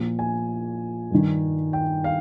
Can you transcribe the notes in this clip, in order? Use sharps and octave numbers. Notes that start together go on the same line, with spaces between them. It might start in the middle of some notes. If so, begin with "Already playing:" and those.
Already playing: A#2 F3
G#5
G2 D#3
G5
F5